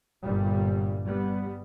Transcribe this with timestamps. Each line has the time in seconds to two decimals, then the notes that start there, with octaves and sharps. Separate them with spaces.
0.23 G1 G2 A#2 G3
1.07 G3 B3